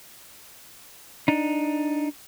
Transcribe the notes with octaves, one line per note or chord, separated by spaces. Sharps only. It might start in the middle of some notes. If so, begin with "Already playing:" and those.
D4 D#4